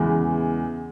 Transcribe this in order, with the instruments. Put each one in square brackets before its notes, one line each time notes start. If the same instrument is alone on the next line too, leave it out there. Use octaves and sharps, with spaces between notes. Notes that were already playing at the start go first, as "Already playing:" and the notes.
Already playing: [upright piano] E2 C#3 E3 G#3